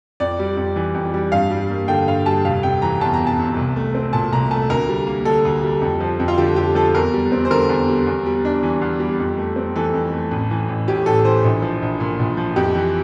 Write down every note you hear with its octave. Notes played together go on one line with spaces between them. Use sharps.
F2 D5
G3
F2
E3
F2
G3
G2 F5
G3
A#3
D3 G5
G2 F5
G3 A5
F1 F5
C3 G5
E3 A#5
E2 A5
A#5
F1
A5
C3
C2
A3
C4
A#2 A5
C2 A#5
A3 A5
D2 A#4
G3
A#3
D3 A4
D2
G3
F2
F3
F2
F4
D3 G4
F2 G4
F3 A4
E2 A#4
G3
C4
C5
D3 A#4
E2
G3
E2
G3
D4
E3
E2
G3
F2
A3
C4
E3 A4
F2
A3
A1
E3
A1
A2 G4
A1 A4
E3 C5
A#1
F3
A#1
A#2
A#1
F3
F2 G4
E3